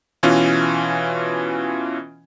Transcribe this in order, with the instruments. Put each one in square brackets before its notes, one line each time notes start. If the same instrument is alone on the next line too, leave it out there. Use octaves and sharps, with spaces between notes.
[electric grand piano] B2 E3 C#4 F4